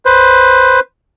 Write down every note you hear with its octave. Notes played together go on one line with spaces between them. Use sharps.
B4 C5